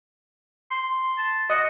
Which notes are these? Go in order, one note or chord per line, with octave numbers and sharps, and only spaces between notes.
C6
A5
F#4 D#5 D#6